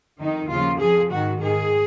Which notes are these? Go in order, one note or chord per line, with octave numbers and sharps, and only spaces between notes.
F2 D#3 D#4
D#2 C#3 F3 F4
F2 F3 G#4
G#2 D#3 F#4
G#2 D#3 G#4